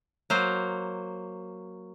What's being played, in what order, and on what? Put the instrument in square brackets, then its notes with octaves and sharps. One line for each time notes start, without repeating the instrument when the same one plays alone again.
[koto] F#3 A#3 C5